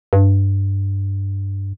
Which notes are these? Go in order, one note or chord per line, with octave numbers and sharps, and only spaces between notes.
G2